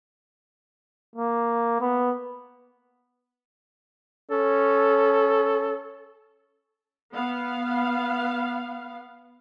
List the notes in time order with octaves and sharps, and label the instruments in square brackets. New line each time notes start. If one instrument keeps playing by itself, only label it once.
[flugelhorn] A#3
B3
[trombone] C#4 [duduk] A4
[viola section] B3 F5